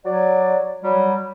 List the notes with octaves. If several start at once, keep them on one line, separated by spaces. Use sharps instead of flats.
F#3 D5
F#3 G3